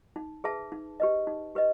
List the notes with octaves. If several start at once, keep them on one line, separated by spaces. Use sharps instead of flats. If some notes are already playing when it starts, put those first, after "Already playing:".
D#4
G#4 B4 E5 A5
D#4
G4 B4 D#5
D#4
G4 B4 D#5